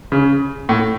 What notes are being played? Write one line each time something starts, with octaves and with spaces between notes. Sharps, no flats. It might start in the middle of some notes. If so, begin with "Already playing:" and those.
C#3
A2